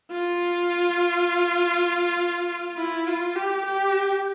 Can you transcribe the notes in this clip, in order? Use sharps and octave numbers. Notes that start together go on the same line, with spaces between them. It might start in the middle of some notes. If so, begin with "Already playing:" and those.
F4
E4
F4
G4
G4